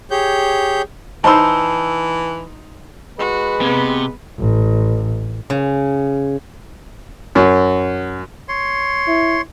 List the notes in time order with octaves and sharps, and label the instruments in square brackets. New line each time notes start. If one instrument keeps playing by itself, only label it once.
[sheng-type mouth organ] G4 G#4 C#5 G6
[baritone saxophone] E3 [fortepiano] D#4 C5 C6 [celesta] A5 B5 E6
[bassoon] G#3 [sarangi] F#4 [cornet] B4
[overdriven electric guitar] C3 [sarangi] B3
[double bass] A1
[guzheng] C#3
[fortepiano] F#2
[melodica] C#5 C6
[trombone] E4